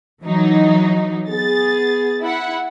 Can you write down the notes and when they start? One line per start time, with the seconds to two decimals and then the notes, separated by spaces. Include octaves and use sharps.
0.22 E3 F#3 D#4
1.29 B3 G#4 A6
2.22 E4 F#5